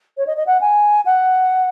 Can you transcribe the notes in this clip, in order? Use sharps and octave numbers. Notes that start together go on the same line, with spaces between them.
C#5
D#5
D#5
F#5
G#5
F#5